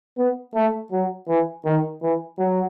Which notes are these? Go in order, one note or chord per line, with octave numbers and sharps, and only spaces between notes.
B3
A3
F#3
E3
D#3
E3
F#3